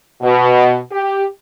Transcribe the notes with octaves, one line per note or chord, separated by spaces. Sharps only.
B2
G4